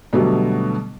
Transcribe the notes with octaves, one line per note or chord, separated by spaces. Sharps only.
B2 D3 F#3 G3 A3 B3